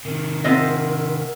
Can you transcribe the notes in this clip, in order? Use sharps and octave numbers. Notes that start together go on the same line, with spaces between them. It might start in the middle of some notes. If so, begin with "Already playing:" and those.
C3 D#3 A#4
C4 F4 G#4 D#5 E5 F#5